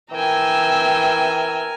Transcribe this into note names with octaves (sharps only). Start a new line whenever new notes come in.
E3 A#4 G5 G#5 E6